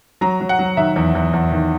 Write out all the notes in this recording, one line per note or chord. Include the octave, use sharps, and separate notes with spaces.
F#3 A#5
F#3
F#5
F#3
D#3 E5
E2
E2
E2
D#3